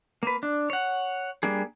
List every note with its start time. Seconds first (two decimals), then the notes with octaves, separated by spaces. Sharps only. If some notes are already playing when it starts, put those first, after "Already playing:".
0.23 A#3 B4
0.43 D4
0.70 C#5 F#5
1.43 G3 A#3 D4 G#4